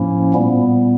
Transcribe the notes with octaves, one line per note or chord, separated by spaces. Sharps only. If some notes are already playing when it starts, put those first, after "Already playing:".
Already playing: A2 F3 A#3 C#4 E4
A#2 G3 B3